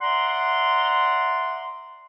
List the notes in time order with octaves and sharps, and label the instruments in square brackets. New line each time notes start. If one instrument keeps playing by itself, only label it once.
[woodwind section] D5 E5 F#5 A#5 C6